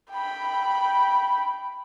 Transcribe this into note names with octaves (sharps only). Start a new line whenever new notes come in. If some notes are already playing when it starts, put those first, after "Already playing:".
G5 B5